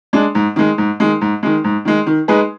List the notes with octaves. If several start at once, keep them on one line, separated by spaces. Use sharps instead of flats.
G#3 D4
G#2
D#3 G#3
G#2
D#3 G#3
G#2
D#3 G#3
G#2
D#3 G#3
D#3
G#3 D#4 G#4 B4